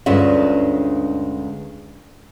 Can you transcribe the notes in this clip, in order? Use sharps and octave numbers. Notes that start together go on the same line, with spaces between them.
D2 G2 G#3 C#4 F4 E5